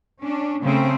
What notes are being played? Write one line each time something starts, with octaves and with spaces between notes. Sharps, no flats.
C#4 D4
C#3 A3 C4